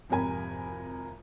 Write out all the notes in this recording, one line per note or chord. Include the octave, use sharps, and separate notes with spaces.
G#1 F2 C3 A#4 G#5 B5